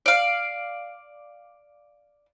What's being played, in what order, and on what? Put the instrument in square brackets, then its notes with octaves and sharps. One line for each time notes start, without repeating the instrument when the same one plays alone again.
[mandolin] D5 F5